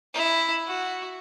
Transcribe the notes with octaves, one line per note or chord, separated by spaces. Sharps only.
E4
F#4